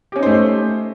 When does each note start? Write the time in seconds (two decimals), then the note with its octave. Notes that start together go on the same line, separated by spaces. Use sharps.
0.12 G4
0.16 C#4
0.19 D#4
0.23 C5
0.26 A3